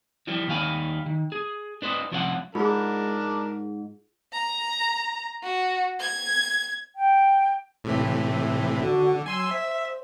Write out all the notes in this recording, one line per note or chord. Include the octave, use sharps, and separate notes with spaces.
E3 F3 G3
D#2 D#3 G3 F5 G#5 B5
D#3
G#4
D4 B4 C5 D#5
C2 F3 C#4 F4 C#5 F#5
G#2 D4 F4 G#4 A#4
A#5
F#4
G#6
G5
A2 C3 E3
D3 F#4
F#3 G#5 C6 E6
C5 E5